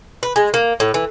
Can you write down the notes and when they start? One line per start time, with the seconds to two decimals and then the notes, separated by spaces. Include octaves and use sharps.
0.23 B4
0.36 G#3
0.54 A#3
0.80 A2
0.94 E3